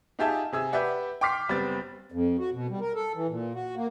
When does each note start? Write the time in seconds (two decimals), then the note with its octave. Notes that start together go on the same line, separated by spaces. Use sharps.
0.19 D#4 F4 G4 G#4 E5 A5
0.53 C3 G#4 E6
0.73 G4 B4 D5 E5 F#5
1.21 G5 C6 D6 F6 B6 C7
1.49 F#1 G3 B3 C4 A6
2.12 F2
2.39 F#4
2.53 B2
2.70 G3
2.81 A#4
2.95 A4
3.15 E3
3.29 A#2
3.54 F#4
3.76 A#3